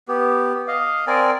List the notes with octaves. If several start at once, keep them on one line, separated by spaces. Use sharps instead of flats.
B3 G4
D#5 F5
C4 A#4 D5 G#5